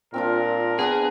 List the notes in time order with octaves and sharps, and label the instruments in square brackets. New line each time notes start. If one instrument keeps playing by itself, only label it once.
[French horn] A#2 [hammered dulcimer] C4 D4 F4 [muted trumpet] A#4
[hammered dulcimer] B3 D4 B4 [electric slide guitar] G#4